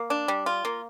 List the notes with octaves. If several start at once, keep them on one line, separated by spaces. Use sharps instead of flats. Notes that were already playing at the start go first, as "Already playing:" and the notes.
Already playing: A#3
D4
G3
F4
A#3